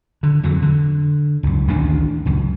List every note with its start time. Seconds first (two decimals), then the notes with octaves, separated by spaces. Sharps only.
0.23 D3
0.43 F2 D3 F#3
0.62 D3
1.43 C#2 F#2
1.68 A1 D2 D#3 D4
2.26 C#2 F#2